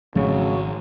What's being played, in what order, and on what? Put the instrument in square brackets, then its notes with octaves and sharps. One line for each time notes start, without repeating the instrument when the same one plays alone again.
[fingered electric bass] G#1 [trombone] C#3 [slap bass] F3 A3 C4 [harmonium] F#3 F#4